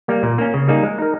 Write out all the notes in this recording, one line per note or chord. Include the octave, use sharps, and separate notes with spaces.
G3 A#3
A#2
A#3 C#4
C#3
G3 A#3 D#4 G#4
G#3
D#4 A#4